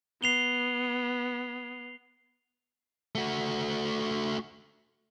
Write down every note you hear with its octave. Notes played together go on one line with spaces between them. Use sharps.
B3 C7 F7 G7
A3 F#4